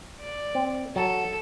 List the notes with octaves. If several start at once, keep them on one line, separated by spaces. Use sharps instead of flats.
D5
C4
F#3 A4